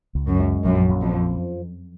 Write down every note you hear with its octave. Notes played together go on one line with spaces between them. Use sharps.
C#2
F#2
G#3
A#1 F#2
A#1
F2
F3